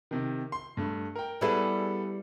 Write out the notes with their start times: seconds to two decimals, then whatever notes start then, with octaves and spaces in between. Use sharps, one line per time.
0.11 C3 D#3
0.52 C6
0.77 G2 A3
1.16 A#4 G5
1.41 G3 B3 E4 G#4 A4 B4